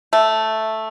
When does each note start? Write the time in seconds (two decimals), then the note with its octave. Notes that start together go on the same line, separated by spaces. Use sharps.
0.13 A3